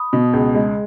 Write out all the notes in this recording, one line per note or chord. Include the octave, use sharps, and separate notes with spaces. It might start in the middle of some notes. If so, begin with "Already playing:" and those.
Already playing: B5 D#6
B2
C#2
G#3